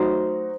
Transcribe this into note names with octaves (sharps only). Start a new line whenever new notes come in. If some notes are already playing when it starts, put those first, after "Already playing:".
Already playing: F#3 A3 D#4 F#4 C5